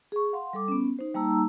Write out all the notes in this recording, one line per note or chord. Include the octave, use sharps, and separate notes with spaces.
G#4 C#6
F5 F#5 C6
G3 A4 D6
B3 C#4
D#4 C5
G3 A#3 D#4 A5 A#5 E6